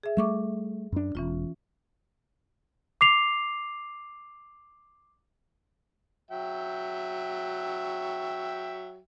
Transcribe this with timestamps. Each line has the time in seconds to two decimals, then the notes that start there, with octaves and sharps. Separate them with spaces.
0.03 G#4 E5
0.17 G3 A3 E5 C#6 D6
0.92 F#2 D4
1.15 E1 E3 C#4 F4
3.01 D6 C7 F7
6.31 F#3 E5 G5